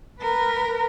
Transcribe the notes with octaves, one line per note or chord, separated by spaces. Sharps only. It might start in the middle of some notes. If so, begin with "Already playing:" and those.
A#4 B4